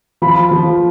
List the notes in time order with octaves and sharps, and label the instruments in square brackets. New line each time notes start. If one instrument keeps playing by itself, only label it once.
[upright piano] F3 B5
F3